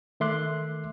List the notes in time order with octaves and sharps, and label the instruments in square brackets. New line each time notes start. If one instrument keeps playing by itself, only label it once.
[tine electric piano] D#3 A3 E5 C6 D6 F#6